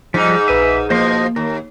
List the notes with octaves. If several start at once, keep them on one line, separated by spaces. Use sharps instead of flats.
G#2 F3 G3 D#4 B6
A#1 B4 E5 D#7
B2 F3 A#3 C5 D#5 C6
D#2 A#4